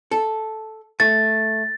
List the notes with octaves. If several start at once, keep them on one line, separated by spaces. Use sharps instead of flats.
A4
A3 A6